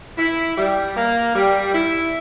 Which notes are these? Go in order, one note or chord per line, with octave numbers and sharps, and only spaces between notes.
E4
G3
A#3
G3
E4